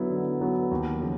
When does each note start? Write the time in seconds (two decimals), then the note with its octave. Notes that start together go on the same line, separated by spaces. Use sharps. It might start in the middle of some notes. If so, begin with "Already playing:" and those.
Already playing: D3 F#3 B3 E4
0.10 D3
0.41 F#3 B3 E4
0.71 D#2
1.01 C#3 F3